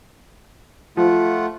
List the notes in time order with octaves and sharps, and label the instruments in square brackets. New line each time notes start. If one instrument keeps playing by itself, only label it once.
[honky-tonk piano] F3 [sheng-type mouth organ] A3 F4 F#5